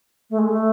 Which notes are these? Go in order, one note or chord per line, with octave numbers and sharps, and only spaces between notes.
A3
G#3
A3